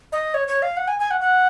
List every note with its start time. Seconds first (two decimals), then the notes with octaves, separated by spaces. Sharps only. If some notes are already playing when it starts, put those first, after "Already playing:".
0.12 D#5
0.34 C#5
0.48 C#5
0.62 F5
0.77 F#5
0.88 G#5
1.00 G#5
1.11 F#5
1.21 F#5